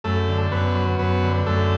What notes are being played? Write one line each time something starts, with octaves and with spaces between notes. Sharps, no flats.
F#2 A3 A4
D3
F#2 B3 B4
F#3
F#2 B3 B4
D3
F#2 A3 A4